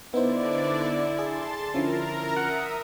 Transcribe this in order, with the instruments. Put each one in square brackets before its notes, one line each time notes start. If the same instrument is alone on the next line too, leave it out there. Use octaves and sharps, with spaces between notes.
[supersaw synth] D3 D5 [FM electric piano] B3 D#4 C5 [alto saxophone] E4
[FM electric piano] G#4 [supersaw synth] A5 C6 A6
[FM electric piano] D3 F3 C#4 [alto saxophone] E4 [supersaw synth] A#4 A#5
[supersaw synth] E5 D#6 [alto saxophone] F#5